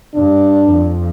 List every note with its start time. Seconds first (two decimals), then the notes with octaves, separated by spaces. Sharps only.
0.15 G2 D4
0.70 F2